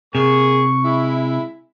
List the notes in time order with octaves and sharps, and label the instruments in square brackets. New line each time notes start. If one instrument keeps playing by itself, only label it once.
[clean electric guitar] C3 [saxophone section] A#3 G#4 [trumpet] C#6
[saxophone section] G#3 E4